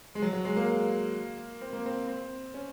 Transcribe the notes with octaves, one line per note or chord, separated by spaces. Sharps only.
G#3
F#3
F#3
G#3
A#3
C4
A#3
C4
C4
C#4